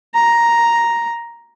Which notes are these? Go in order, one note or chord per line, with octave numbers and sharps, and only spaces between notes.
A#5